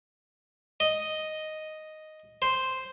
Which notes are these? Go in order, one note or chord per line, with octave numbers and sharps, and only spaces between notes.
D#5
C5